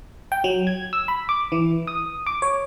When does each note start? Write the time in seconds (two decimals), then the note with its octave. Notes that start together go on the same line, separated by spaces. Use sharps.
0.32 G5
0.44 F#3
0.67 G#6
0.93 E6
1.08 B5
1.29 D6
1.52 E3
1.87 D#6
2.26 D6
2.42 C#5